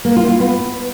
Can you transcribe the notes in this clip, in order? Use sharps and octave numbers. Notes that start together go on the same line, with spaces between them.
A#3
F4
F4
B3